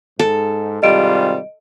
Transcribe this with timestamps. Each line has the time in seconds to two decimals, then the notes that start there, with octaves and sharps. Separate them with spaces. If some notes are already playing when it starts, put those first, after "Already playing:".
0.19 G#2 A4
0.83 G#1 C3 G3 F4 D#5 D7